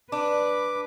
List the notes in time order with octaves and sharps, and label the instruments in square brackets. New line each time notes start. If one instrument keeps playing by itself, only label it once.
[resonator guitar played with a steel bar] D4 [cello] B4 [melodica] D6